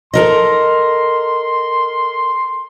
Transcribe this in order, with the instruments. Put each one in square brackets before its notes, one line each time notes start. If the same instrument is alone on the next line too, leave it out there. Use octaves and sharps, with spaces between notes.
[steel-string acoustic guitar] A4 A#4 D#5 [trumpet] C6